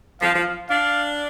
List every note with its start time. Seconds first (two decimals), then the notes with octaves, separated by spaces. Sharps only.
0.21 F3 F5
0.34 F3
0.70 D4 F5